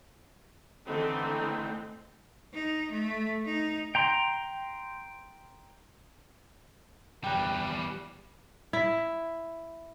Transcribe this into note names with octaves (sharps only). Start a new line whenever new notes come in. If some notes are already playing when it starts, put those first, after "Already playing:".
D3 E3 A3 C4 D#4
D#4
A3
D#4
G5 A#5 C6
E2 G3 G5 F#6
E4